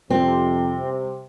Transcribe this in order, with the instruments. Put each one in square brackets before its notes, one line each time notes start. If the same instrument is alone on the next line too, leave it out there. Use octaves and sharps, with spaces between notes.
[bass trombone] F2 [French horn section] C3 [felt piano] G3 [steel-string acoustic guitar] C4